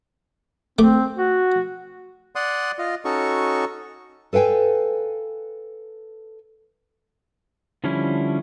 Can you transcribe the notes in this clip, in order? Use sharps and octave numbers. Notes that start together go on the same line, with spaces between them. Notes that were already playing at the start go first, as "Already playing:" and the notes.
A3 C4 D6
F#4
D5 F#5 C6 D#6
F4 D#5
C#4 D#4 F#4 A4 C#6
A4 B4 F5 G5 G#5
D3 F3 G3 C#4 E4